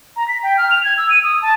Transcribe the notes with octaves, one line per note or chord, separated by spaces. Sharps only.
A#5
B6
G5
F6
F7
G#6
E6
D#7
D#6
A5